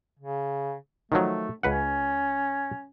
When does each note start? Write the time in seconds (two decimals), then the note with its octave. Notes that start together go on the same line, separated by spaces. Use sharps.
0.19 C#3
1.12 D#3 F3 F#3 A3
1.63 C#2 C#4 B4 F#5